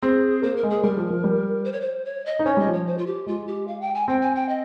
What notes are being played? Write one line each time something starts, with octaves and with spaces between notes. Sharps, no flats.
C4 G#4
A#3 C5
A#4
G#3
G#4
G3 A#4
F3
F3
G3
C5
C#5
C5
C#5
D#5
D#4
C#4 C#5
G3 D#5
F3
C#5
C5
F4
G4
G#3 F4
G4
F5
G5
G#5
C4 G5
G#5
G5
D#5